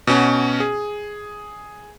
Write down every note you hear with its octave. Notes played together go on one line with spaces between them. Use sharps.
B2 C#4 F#4
G#4